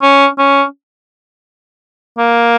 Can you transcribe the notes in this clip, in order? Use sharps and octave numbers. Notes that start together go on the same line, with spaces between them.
C#4
C#4
A#3